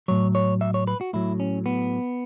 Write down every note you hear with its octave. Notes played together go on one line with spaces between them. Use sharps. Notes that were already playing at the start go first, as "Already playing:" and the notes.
A2 F#3 C#5
C#5
E5
C#5
B4
F#4
A2 F#3 E4
C#4
B3